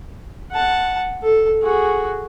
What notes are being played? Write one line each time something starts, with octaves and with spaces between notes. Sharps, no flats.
F#5 A5
A4
F#4 G#4